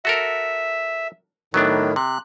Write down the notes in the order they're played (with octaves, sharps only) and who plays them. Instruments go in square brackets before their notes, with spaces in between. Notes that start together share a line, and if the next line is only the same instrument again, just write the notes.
[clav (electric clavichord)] F#4 A4 A#4 [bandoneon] E5
[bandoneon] A2 D#3 [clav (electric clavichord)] F#3 B3 D4
[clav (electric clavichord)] C3 [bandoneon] F#6